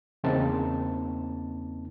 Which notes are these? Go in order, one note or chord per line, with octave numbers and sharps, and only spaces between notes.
E2 C#3 A#3 C4 D#4 A5